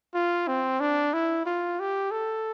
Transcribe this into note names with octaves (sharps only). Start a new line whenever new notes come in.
F4
C4
D4
E4
F4
G4
A4